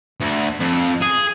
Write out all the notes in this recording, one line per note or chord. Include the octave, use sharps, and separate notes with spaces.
D2
F2
G#4